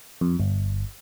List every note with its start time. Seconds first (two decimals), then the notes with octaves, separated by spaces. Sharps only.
0.21 F2
0.40 G1